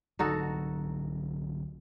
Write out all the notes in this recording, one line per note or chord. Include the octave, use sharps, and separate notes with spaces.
C2 D3 F#3 D#4 F#4 A4